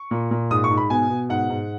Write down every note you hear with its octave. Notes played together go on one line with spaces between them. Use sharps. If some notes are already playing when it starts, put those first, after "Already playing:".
Already playing: C#6
A#2
A#2
G#2 D#6
C#6
G#2
B5
B2 G#5
B2
G#2 F#5
G#2